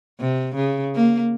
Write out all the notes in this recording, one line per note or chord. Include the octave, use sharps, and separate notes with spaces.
C3
C#3
A#3